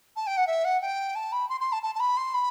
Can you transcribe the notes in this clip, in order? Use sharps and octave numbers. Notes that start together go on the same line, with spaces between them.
A5
G5
F#5
E5
F#5
G5
A5
B5
C6
C6
A5
A5
A5
B5
C6
B5